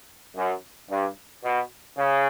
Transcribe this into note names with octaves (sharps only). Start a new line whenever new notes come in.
F#2
G2
B2
C#3